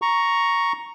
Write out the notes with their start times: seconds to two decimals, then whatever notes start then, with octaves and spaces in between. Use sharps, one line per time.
0.02 A#5 C#6